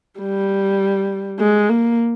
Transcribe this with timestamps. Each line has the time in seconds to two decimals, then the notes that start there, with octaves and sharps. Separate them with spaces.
0.20 G3
1.39 G#3
1.69 A#3